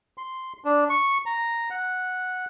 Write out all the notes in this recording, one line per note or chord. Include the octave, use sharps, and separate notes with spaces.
C6
D4
C#6
A#5
F#5